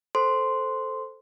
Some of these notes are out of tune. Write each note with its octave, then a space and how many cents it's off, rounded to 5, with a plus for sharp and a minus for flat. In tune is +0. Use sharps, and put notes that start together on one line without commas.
A4 +0 C5 +0 C6 -5